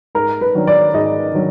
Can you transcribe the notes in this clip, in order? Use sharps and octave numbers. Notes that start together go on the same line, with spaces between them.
G#2 A#4
B4
D#3 F#3 D4
D5
G#2 D#5
D#3 F#3 D4